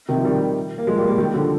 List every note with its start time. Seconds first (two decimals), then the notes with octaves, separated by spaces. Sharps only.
0.09 C3 D#3
0.17 F3
0.24 D#3 G3
0.78 A#3
0.87 F3 G#3
0.97 G3 A#3
1.08 G3 A#3
1.18 D#3 G3
1.34 D3 F3